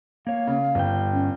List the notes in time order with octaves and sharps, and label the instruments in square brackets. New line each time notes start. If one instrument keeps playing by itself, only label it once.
[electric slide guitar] A#3 C#5 [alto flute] F5
[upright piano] C#3
[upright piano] G1 [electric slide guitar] G2 G5
[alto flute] C#4